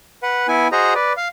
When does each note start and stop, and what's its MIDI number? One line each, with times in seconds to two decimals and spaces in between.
0.23 0.47 71
0.23 0.47 78
0.48 0.68 59
0.48 0.68 64
0.48 0.68 80
0.72 0.94 66
0.72 0.94 68
0.72 0.94 72
0.72 0.94 75
0.72 0.94 82
0.95 1.13 71
0.95 1.13 74
1.17 1.28 77